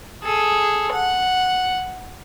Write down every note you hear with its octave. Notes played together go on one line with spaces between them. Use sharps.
G#4 A4
F#5